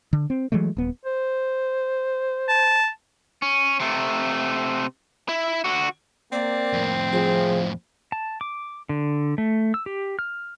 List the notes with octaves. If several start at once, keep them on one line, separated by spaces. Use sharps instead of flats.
D3
C4
E3 F#3 G#3 A3
D#1 B3
C5
A5
C#4
C3 A3
E4
D3 F#4
A#3 C4 D5
F2 A2
F3 G#4
A5
D6
D3
A3
E6
G4
F6